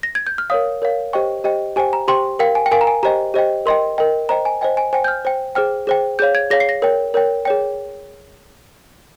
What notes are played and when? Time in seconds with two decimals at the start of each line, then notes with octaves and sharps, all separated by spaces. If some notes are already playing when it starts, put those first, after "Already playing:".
0.03 A#6
0.15 G#6
0.27 G6
0.38 F6
0.50 A#4 C#5 F5 D#6
0.82 A#4 C#5 F5
1.13 G4 C5 D#5 G5 C#6
1.44 G4 C5 D#5 G5
1.76 G4 C5 G5 G#5
1.93 A#5
2.08 G4 C5 G5 C6
2.39 A#4 F5 G5
2.55 G#5
2.66 G5
2.71 A#4 F5 G#5
2.81 A#5
2.87 G#5
3.03 G4 C5 D#5 G5 A#5
3.34 G4 C5 D#5 G5
3.66 A#4 D#5 G5 C6
3.98 A#4 D#5 G5
4.29 C5 D#5 G5 A#5
4.45 G#5
4.61 C5 D#5 G5 G#5
4.77 G#5
4.93 C5 G5 G#5
5.04 G6
5.08 F6
5.25 C5 G5
5.55 G#4 C5 G5 F6
5.87 G#4 C5 G5
6.19 G#4 C#5 F5 G6
6.35 G#6
6.50 G#4 C#5 F5 A#6
6.60 C7
6.69 A#6
6.82 A#4 C#5 G5
7.14 A#4 C#5 G5
7.45 G#4 C#5 G5